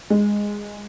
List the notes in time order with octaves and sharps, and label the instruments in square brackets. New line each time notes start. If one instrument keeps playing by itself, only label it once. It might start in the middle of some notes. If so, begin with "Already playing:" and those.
[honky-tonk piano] G#3